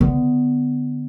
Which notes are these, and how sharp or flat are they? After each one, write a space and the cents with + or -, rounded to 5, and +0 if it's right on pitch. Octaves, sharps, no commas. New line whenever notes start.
D3 +0 B3 +10